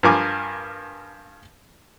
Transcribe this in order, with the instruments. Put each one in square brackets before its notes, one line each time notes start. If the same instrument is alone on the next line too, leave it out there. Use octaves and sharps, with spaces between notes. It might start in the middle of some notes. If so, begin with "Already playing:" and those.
[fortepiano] G2 F3 A#4 G#5 D6